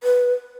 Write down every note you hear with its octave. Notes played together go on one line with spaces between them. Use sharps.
B4